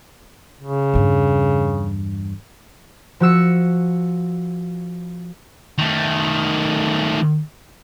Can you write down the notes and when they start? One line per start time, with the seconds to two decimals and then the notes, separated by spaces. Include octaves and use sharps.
0.61 C#3
0.94 E2 G2
3.20 F3 F#4 E6 C#7
5.78 D#3 A3